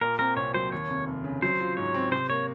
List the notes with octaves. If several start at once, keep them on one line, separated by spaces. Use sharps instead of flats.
A#2 A#4
C4 A#4
C2 C#5
F#3 C5
D#2 C#5
F1
F1
C#3
F#3 C5
F4
G#2 C#5
C4
C3 C5
A#3 C#5